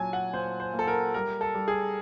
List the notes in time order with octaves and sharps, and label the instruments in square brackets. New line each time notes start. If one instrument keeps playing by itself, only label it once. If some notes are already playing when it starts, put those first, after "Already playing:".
Already playing: [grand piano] A#2 F#3 G#5 A5
F#5
A#2 C5
C5
A#3
A4
A#4
G3 A#4
A4
G3
G#4